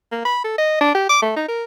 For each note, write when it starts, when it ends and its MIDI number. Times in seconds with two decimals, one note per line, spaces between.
0.11 0.25 58
0.25 0.42 83
0.44 0.56 69
0.58 0.79 75
0.81 0.93 62
0.95 1.09 67
1.09 1.21 86
1.22 1.31 57
1.36 1.45 63
1.48 1.63 70